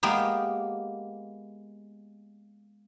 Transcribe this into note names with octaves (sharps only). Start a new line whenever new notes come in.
G#3 A#3 B3 G4